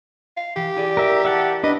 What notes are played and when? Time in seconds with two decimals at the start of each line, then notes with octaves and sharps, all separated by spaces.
0.37 F5
0.56 E3 G4
0.76 E4 G#4 D5
0.97 A#4 E5
1.25 E5 F#5 A5
1.63 D4 B4 D#5